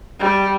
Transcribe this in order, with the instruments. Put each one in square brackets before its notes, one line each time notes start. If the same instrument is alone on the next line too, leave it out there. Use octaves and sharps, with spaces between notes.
[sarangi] G3